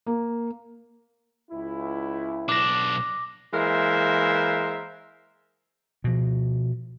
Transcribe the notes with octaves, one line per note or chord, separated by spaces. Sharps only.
A#3
C#2 E4
B1 D4 D6 A#6
E3 G#3 A#3 A#4 C5 E5
B2 F3